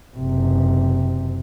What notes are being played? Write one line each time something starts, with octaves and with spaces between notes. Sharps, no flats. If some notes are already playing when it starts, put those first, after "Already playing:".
F#1 C3